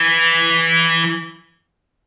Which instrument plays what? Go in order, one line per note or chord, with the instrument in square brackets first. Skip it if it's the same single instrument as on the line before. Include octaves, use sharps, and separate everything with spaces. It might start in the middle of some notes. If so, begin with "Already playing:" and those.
Already playing: [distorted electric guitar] E3